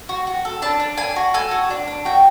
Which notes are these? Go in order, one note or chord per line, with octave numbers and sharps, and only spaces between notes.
F#4
F#4
A4
D4 A5
D4
D4 G#5
F#4
A4 G#5
F#4
D4
D4
F#4 G5